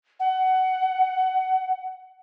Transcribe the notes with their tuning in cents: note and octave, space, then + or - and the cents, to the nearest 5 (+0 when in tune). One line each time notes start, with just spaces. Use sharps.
F#5 +20